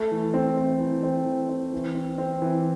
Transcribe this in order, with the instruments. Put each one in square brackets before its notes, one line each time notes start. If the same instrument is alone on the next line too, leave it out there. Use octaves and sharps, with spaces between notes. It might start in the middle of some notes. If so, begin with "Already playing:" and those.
Already playing: [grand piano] A3
E3
C4
C4
E3
C4
E3
C4
E3
C4
C4
E3